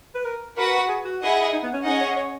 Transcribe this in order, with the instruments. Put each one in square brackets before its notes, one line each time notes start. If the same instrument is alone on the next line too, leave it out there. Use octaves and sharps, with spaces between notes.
[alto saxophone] B4
A#4
[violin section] F#4 B4 F#5 [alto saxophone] A#4
[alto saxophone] G#4
F#4
[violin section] E4 G#4 D#5 F#5
[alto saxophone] D#4
B3
C#4
[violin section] C#4 G#4 D#5 F#5 [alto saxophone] D#4
[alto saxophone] C#5
C#5